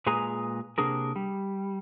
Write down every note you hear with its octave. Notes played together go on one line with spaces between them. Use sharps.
A#2 G#3 G#4 B4 G#5 A#5
C3 A#3 D4 G#4 A#4
G3